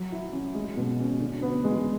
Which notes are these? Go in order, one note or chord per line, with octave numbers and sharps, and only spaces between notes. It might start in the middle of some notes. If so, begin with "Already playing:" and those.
Already playing: F#3
E4
C#4
G#3
B2
C#4
D3
B3
G#3